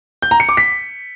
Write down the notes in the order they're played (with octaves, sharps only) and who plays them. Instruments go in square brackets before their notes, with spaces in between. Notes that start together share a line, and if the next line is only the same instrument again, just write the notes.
[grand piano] G6
A#5
C#7
D6
B6